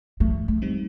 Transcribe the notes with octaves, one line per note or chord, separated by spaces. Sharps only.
E3 A3
A3
G3 C4 D#4